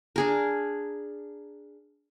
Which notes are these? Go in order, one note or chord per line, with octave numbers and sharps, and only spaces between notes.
D4 G#4 A#4